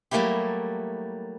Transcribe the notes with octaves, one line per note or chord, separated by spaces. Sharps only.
F#3 G3 A3 A#3 E4 G4